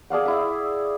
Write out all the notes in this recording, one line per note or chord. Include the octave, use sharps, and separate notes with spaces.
G#4 D5 F5 F#5
E4 E5